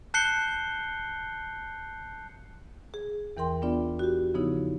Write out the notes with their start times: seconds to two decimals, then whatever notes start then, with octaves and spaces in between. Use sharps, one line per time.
0.14 A5 F#6 G6 C7 C#7 G7
2.94 G#4
3.37 E2 E3 A#4 G5 C6
3.62 B3 D4 F4 D5
3.99 F#4 G4
4.34 C#3 F3 B3 D#4 E4